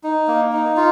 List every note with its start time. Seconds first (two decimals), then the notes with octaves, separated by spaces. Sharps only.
0.04 D#4
0.28 A#3
0.53 D#4
0.77 F4